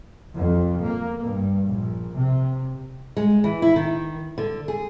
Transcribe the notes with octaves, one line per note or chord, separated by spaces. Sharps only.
F2
A#3
G2
A#1
C3
G#3
E3
E4
D#3
D3
G#4